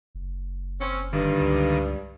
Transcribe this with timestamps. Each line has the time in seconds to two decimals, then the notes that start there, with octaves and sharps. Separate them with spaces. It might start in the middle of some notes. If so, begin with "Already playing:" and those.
0.15 F#1
0.79 C4 C#4
1.13 G2 D3 D#3
1.40 C#2